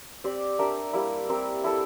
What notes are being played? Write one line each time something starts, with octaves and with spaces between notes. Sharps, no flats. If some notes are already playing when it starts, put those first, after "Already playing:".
C4 G4 D5
D4 G4 A#4 E5
G3 A#3 E4
C4 G4 A#4
E4 A4 E5